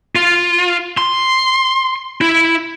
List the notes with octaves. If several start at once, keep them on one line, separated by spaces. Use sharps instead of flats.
F4
C6
E4